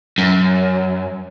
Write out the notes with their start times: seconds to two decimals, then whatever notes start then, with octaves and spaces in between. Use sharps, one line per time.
0.18 F#2